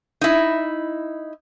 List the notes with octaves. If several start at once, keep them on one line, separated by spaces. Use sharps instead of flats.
D#4 E4